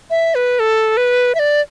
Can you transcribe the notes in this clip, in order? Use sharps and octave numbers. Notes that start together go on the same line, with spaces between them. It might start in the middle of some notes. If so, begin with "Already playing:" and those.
E5
B4
A4
B4
E5
D5